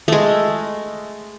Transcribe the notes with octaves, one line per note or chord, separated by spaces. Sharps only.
G#3 A3